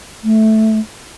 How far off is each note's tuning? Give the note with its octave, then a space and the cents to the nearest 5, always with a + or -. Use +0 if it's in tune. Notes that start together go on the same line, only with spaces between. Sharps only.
A3 -5